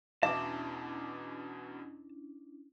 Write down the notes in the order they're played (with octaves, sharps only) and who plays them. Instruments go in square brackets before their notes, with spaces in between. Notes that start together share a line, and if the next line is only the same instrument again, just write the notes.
[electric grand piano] E2 B2 D6 [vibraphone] C#4 D4 E4 [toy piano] E5 [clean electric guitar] A5